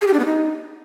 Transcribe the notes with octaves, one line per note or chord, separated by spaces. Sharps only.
G#4
G4
D4
B3
D#4